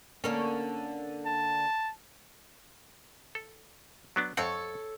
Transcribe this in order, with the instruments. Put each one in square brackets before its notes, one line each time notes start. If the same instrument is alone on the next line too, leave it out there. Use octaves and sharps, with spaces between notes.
[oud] D3 A#3 C#4
[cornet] A5
[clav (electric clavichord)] A4
F#3 B3 D4
[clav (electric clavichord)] F2 C4 F#5 [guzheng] A4 C#5